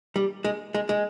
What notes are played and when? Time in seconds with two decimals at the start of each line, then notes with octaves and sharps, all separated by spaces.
0.16 G3
0.44 G#3
0.74 G#3
0.89 G#3